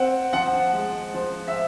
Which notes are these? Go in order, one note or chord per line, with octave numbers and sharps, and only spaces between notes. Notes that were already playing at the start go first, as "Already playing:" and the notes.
Already playing: C4 F#5
F3 F#5
G#3
F3
E5